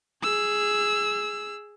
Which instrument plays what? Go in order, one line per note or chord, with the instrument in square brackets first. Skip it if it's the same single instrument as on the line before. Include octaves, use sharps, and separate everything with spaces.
[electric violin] G#4 E6